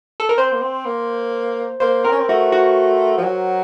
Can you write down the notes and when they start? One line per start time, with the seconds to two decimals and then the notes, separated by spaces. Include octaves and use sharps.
0.20 A4
0.29 A#4
0.38 C4 C5
0.52 A#3
0.61 C4
0.85 A#3
1.80 A#3 C5
2.04 C4 A#4
2.12 C#4
2.20 C4
2.28 A3 F#4
2.52 F#4
3.18 F3
3.24 F#3